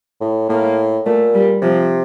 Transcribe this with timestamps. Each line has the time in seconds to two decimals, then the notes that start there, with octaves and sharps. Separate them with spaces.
0.21 A2
0.49 A2 A#3
1.06 A#2 A3
1.34 G3
1.62 C3 F3